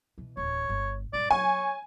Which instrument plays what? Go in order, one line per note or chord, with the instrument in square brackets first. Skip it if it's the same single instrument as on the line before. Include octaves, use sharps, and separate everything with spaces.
[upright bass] B2 E3
[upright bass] D1 E2 [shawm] C#5
[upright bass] G1
[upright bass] A#1 G2 [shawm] D5
[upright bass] F#3 [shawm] C#5 [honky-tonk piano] G#5